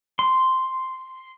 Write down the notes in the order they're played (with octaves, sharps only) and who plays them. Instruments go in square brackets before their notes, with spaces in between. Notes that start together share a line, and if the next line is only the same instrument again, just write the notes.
[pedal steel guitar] C6